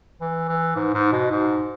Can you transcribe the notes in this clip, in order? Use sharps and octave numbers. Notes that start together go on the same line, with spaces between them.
E3
E3
G#2
G#2
B2
G#2